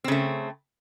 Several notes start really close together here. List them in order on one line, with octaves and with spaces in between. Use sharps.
C4 C#3 A3